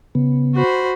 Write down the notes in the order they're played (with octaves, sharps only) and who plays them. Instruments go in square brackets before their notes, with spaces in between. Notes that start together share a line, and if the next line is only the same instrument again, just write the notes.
[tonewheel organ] C#3 B3
[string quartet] F#4 C5 B5